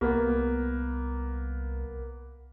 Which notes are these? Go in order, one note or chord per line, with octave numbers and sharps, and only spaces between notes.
C2 A#3 B3